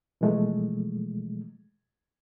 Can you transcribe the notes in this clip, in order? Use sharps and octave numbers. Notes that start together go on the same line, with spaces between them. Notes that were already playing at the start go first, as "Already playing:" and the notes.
B2 E3 F3 G#3 A3